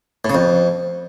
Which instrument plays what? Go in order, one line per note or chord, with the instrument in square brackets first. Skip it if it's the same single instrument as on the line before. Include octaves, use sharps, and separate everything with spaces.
[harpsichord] A2
C#3
F2